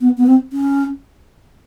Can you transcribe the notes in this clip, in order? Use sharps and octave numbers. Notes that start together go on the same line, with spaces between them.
B3
B3
C4
C#4